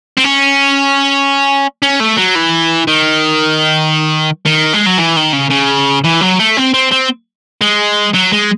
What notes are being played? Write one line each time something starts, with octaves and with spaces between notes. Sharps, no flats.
C4
C#4
C#4
A3
F#3
E3
D#3
D#3
G#3
F#3
E3
D#3
C#3
C#3
E3
F#3
A3
C4
C4
C4
G#3
F#3
G#3